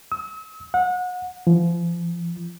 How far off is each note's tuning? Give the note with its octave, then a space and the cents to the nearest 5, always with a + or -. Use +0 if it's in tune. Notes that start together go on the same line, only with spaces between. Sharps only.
E6 -45
F#5 -30
F3 -35